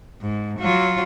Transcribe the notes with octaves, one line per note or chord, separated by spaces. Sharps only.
G#2
F#3 F4